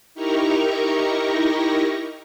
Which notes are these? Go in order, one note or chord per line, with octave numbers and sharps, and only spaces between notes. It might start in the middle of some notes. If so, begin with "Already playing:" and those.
D#4 E4 G4 A#4 A#5 C#6